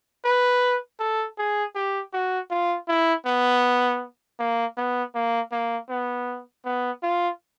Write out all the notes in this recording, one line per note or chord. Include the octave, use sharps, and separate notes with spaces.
B4
A4
G#4
G4
F#4
F4
E4
B3
A#3
B3
A#3
A#3
B3
B3
F4